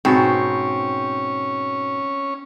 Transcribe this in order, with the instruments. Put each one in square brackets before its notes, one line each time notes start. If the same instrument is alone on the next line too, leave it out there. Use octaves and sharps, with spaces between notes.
[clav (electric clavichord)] G#2 B2 [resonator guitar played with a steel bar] C4 [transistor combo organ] C#4